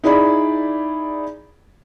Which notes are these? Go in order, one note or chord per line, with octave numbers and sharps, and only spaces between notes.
D#4 E4 G#4 D5 B5